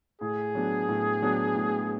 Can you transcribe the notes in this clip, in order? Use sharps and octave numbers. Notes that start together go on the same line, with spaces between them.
A2 G#4
F#3 B3 D4
A2
F#3 B3 D4
A2